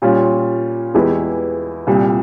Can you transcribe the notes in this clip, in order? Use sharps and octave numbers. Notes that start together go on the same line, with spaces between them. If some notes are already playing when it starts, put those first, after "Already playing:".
A#2 G3 C#4 F4
E2 E3 G#3 E4 G4
C2 A#2 G3